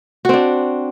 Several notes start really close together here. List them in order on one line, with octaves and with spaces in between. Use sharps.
F#4 C4 D4